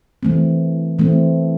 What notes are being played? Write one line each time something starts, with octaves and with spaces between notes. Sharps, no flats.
E3 A3 C4
E3 A3 C4